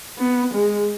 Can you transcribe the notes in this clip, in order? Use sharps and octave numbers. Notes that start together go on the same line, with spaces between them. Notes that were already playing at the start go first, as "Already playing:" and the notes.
B3
G#3